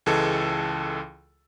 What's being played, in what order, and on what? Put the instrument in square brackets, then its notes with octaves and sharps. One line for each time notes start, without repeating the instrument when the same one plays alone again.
[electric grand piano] C#2 E3 G#3 A4